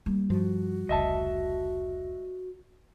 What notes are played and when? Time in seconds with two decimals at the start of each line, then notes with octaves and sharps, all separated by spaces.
0.06 G3 A#3
0.30 G2 F3 F#4
0.89 F1 C#2 D#5 E5 A5